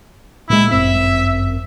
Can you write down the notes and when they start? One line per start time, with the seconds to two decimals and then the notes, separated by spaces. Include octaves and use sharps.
0.50 A#2 G#3 E4
0.71 G1 F#2 C4 E5